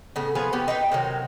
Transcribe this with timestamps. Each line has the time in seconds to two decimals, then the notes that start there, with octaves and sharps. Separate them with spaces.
0.16 A2 C#3 B3
0.35 F3 B3 G#4 F5
0.53 B3 C#4 G4
0.68 D#4 B4 G5
0.92 C3 D#3 F#3